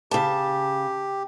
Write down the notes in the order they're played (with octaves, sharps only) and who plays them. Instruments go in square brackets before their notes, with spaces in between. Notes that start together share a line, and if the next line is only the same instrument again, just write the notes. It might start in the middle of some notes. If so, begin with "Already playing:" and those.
[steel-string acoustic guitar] C#3 A5 [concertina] G4